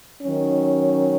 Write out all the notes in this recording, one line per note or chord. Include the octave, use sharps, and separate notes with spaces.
D#3 F#3 C#4